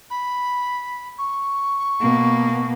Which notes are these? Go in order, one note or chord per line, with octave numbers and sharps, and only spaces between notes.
B5
C#6
B2 A#3